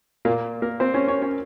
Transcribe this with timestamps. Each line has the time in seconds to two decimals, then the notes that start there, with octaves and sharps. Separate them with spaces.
0.25 A#2 A#3
0.62 A#3 A#4
0.80 C4 C5
0.94 C#4 C#5
1.08 C#4 C#5
1.22 C#4 C#5